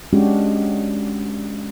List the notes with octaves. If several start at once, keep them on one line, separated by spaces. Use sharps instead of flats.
G#3 C#4 D4 F#4 G4